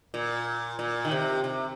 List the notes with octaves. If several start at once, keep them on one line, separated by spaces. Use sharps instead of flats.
A#2
A#2
D#3
C3
C3